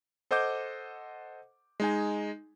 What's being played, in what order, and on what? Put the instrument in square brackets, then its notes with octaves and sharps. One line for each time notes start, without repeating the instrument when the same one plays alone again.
[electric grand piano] A4 C5 D#5 F#5 D6 G6
G#3 D#4 G#5